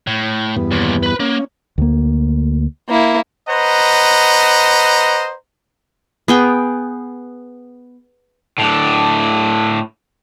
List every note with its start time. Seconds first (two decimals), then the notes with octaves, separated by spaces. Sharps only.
0.07 A2
0.56 E2 G2 B3
0.71 D#2 A#2
1.03 B4 B5
1.20 A#3 C#4
1.78 D2 A#3
2.89 A#3 E4
3.49 B4 C5 D#5 F#5 A#5
6.28 B3 G#4 G5
8.58 A2 D4